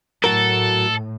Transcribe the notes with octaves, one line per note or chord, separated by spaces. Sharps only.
A2 F#3 F#4 A4 A#4